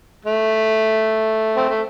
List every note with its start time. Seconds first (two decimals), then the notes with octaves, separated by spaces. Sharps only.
0.25 A3
1.56 C4
1.69 A3